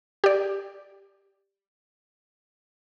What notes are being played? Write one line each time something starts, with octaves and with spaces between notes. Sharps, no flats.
G4 D5